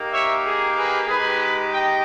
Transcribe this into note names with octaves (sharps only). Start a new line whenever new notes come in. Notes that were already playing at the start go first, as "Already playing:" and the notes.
Already playing: A#3 D#4 G4
C#5 E5
G#4
G#4 B4
G#3 D#4 G4 G#4 B4
D#5 G5